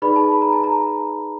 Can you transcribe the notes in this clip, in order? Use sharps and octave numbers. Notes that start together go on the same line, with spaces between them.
D#4 G#4 B4 D5 B5
A5
B5
A#5
A5
A#5